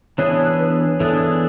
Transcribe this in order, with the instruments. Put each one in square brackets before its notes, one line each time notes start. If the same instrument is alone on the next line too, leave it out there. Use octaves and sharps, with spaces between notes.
[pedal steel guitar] E3 B3 D4 G#4 [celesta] C#5
[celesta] B4
[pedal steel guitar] E3 B3 D4 G#4 [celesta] A4